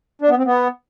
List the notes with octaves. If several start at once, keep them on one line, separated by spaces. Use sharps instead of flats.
D4
B3
C4
B3